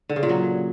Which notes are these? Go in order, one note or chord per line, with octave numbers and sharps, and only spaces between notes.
D3
C#3
A#2
F#3